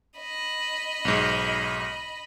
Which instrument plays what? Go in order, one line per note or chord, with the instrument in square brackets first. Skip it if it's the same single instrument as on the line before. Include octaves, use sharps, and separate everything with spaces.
[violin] D#5 B5
[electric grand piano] B1 G#2